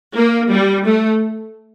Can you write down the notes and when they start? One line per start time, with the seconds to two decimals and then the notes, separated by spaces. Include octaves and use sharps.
0.15 A#3
0.51 G3
0.85 A3